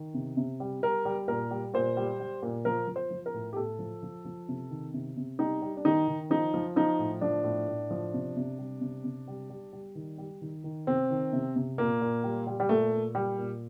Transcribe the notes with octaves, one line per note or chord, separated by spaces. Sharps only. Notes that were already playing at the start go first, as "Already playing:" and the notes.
Already playing: D#3
C3
C3
G3
G3 A#4
G3
A#2 A#4
G3
A#2 C5
G3
G3
A#2
F3 A#4
F3
C5
F3
A#4
A2
G4
A2 A4
F3
F3
F3
C3
D#3
C3
C3
G3 D#4
G3
D4
D#3 D#4
D#3
F3 D#4
F3
F3 D#4
A2
F3 D4
A2
A2
F3
C3
C3
G3
C3
C3
G3
G3
G3
D#3
G3
D#3
D#3
C3 C4
D#3
C3
C3
A#2 A#3
A#2
G3
G3
G3
A#2 A3
A#2
G3
A#2